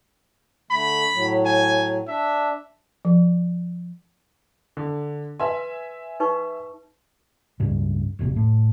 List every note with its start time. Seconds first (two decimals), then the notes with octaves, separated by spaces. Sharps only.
0.71 D3 A3 B5
1.14 A2 F#3
1.46 G#5
2.08 D4 E5
3.05 F3
4.77 D3
5.40 B4 E5 G#5 C6
6.20 D#4 B4 C#6
7.60 C#2 G2 C#3
8.19 E1 A#1 C3
8.36 A2